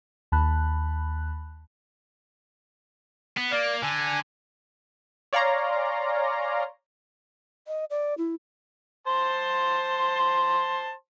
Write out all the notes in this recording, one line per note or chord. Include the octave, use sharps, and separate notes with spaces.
D#2 A5 B5 F#6
B3
A#3 D5
D3 G#5
C#5 D5 F5 G#5 A#5 C6
D#5
D5
E4
C5 A5 C6